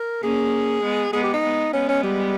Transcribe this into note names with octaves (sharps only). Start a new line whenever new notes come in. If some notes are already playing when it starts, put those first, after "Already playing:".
Already playing: A#4
A#3 C#4 G#4
G#3 B3
G#3 B3 G#4
G4
D#4
G#3 B3
G#3 B3 C#4
C#4
G3